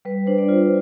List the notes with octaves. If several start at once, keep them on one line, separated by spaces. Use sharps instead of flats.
G3 B4
D4 C5
D5
F4 C5